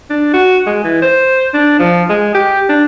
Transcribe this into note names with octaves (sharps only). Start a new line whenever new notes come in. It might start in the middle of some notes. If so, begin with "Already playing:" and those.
D4
F#4
G#3
E3
C5
D4
F3
G#3
G4
D4